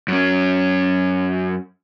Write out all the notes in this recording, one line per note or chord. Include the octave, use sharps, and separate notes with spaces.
F#2 C#4